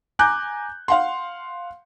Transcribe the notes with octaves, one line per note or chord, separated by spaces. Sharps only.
G#5 A#5 D6 F#6 G6
F5 F#5 C6